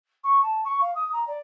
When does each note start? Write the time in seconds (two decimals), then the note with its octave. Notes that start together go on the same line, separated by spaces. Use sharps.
0.24 C#6
0.42 A5
0.65 C#6
0.81 F5
0.95 D#6
1.13 A#5
1.27 D5